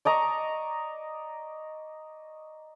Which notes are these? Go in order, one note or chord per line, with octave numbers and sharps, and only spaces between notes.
D5 D#5 A#5 C#6